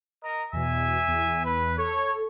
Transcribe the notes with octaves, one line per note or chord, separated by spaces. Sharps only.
A#4 D#5 A#5
E2 B2 E5 G#5
E2
B4
A4 C#5